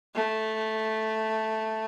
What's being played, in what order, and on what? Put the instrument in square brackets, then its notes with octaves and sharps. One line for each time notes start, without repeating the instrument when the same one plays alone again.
[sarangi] A3